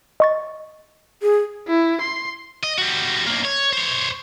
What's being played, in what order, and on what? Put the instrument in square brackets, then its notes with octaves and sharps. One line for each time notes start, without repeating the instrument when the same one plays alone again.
[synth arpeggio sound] D#5 C#6 A6
[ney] G#4
[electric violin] E4
C6
[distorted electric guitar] D#5
G3 F#4
B1 A#3
C#5
C5 C#5